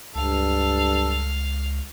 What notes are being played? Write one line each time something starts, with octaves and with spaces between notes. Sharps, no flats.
C#2 G2 A4 F5